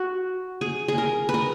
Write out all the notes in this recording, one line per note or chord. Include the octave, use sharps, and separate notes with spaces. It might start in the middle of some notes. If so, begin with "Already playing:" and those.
Already playing: F#4
G#4
G#4
A#4
B4
A#4